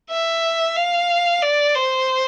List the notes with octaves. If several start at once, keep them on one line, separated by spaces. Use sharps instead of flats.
E5
F5
D5
C5